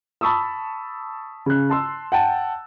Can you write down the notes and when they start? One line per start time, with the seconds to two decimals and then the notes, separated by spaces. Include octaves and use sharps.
0.21 A5 B5 C#6 D#6 E6
1.46 C#3 F#6
1.70 A5 C6 E6
2.12 F#5 G5 A5